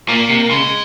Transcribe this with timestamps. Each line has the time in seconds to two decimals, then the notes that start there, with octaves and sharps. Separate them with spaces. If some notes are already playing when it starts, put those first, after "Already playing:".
0.09 A#2 A#3
0.29 C3
0.50 C#3 G#3